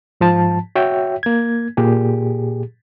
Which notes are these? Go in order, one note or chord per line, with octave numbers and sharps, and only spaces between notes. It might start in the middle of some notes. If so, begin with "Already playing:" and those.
G#2 F3 A5
F#4 C#5 E5 G5
A#3 G#6
A#2 G4 G#4